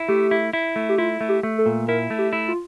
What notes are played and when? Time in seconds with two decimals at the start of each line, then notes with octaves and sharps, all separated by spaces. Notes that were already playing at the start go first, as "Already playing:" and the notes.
Already playing: E4
0.08 A3 G4
0.31 E4
0.53 E4
0.76 A3
0.89 G4
0.98 E4 F4
1.21 A3
1.29 G4
1.43 A3
1.58 A4
1.66 A#2
1.88 E4 A#4
2.10 A3
2.18 G4
2.33 E4
2.48 F4